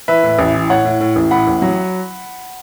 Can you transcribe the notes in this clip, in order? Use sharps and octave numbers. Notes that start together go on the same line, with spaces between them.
E3 B4 E5
A2
A1
E3
A2 C#5 F#5
A2
A2
A1
A2 F#5 B5
A1
F#3